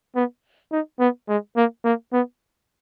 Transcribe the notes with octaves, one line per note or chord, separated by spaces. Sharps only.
B3
D#4
B3
G#3
A#3
A#3
B3